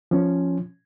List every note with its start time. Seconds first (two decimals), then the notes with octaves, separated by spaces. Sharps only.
0.11 F3 C#4